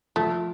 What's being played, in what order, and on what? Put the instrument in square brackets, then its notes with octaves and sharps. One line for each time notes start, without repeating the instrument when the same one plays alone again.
[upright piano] F3 [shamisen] A3